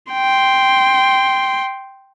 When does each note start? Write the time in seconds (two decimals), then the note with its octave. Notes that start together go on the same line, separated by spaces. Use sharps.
0.13 G5 C6